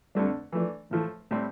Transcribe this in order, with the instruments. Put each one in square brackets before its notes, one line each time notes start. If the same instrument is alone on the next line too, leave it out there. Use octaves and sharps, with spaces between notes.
[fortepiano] F2 D3 A3 D4 [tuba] G3
[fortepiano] E3 A3 D4 [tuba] F3
[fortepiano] A2 F3 A3 [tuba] E3
[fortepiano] A2 G3 C4